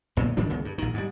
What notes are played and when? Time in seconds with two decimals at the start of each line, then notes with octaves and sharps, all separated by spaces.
0.17 B1 A#2 B3
0.37 G#2 D#3 G3 D4
0.50 C#2 C#3 B3
0.65 G2
0.78 A#1 D#3
0.94 G#2 G3